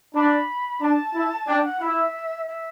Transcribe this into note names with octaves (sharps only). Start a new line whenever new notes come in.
D4 B5
D4 A5
E4
D4 G5
F#5
E4 E5
E5